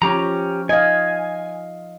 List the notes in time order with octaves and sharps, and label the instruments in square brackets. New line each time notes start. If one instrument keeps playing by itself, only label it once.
[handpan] F3 [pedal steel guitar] C#4 G4 A#5
[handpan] D#5 F5 [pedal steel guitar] G#5